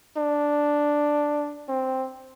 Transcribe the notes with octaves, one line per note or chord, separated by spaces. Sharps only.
D4
C4